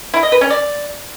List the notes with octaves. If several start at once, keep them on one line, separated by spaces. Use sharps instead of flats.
E4
D#5
B4
C#4
D5